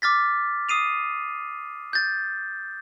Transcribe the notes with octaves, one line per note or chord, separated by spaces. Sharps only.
D6 F6 A6 B6
D#6 C7 D#7 F7
G6 A6